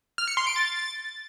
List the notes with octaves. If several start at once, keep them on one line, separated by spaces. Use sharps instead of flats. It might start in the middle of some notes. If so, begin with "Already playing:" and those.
F6
C#7
C6
D7
A6